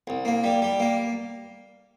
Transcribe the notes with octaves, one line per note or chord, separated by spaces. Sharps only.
C2
A#3
G3
G3
A#3